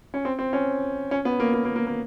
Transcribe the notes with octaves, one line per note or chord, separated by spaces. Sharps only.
C#4
C4
C4
C#4
C#4
B3
A#3
A#3
A#3
A#3
A#3